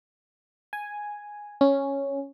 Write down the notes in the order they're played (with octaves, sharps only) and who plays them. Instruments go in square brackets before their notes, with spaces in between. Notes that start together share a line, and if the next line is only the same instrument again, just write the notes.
[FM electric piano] G#5
C#4